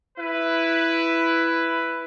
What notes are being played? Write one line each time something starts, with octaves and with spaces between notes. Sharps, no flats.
E4 B4